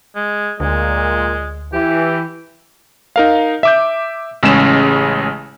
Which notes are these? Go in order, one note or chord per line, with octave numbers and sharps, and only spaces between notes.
G#3
D2 A#2 G#3
E3 G4
D#4 A#4 F5
E5 D6 G6
A1 C#3 G#3 C#4 E7